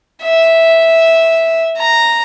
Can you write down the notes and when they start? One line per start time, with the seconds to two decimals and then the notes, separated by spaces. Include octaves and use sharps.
0.23 E5
1.77 A#5